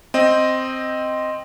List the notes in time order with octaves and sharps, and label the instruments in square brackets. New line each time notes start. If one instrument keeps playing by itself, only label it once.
[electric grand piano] C4 D#5